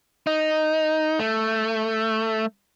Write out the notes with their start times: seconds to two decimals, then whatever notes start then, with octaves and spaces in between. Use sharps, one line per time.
0.27 D#4
1.19 A3